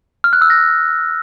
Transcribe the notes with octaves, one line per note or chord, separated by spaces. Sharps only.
F6
F#6
E6
A#6